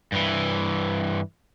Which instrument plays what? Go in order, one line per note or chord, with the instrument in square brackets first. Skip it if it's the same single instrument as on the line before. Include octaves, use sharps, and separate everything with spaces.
[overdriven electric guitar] G2 E3